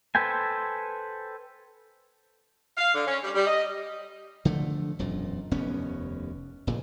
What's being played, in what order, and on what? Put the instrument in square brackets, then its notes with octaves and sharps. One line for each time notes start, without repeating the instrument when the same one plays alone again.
[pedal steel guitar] A4 B4 C5 G5 G#5
[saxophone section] F5
D3
C#4
G3
G3
D#5
[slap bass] D3 F3 A3
E1 F#2 A#2
F1 D#2 B3 C#4
F1 A#2 C#3